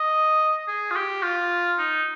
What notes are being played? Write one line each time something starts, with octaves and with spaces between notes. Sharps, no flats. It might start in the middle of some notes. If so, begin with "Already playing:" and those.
Already playing: D#5
G#4
F4
G4
F4
D#4